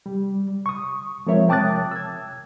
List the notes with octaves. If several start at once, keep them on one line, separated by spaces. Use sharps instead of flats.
G3
C#6 D#6
F3 G#3 C4 A#4 C#5 E5
G5 A5 D6 D#6 F#6 A6
E6 G#6